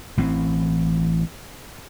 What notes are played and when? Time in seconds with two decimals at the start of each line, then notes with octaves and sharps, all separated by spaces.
0.17 A1 E3 C4